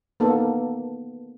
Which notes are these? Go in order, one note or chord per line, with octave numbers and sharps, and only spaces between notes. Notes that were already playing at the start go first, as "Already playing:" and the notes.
A#3 B3 D#4 A4